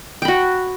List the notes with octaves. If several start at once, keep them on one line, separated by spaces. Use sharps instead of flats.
F#4 G5 B5